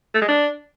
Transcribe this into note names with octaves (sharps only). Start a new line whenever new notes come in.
A3
G#3
D4